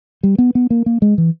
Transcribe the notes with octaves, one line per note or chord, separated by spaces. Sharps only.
G3
B3
B3
A#3
A#3
G#3
E3